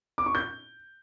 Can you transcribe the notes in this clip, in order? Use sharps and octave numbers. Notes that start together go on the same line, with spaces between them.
D6
C#6
G6